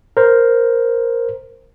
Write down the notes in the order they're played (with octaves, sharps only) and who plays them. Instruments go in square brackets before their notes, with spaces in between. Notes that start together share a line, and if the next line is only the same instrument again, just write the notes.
[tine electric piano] A#4 C5